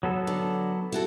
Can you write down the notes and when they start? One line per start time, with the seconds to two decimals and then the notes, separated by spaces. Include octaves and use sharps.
0.03 F#3 B3 A4
0.27 D3
0.92 E4 F#4 A4